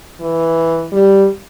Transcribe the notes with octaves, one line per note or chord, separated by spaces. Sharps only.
E3
G3